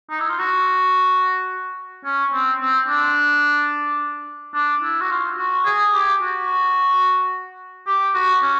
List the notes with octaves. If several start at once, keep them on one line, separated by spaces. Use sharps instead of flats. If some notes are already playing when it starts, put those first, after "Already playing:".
D#4
E4
F4
F#4
C#4
C4
C4
D4
D4
E4
F#4
F4
F#4
G#4
G4
F#4
G4
F#4
C#4